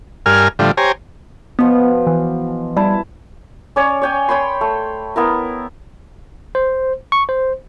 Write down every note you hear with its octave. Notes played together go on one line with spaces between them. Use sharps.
G2 A#4 G#5 F6
A2 D3 F3 G3
G4 C5 C#5 G#5 A#5
B2 F3 B3
E3
G3 E4 A5
C#4 C#5 D5
C#5 G5 G#5
C#5 G5 B5 C6
A3
B3 E4 A#4
C5
C#6
C5